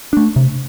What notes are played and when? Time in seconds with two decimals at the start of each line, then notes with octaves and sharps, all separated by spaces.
0.13 A3 D4
0.36 C3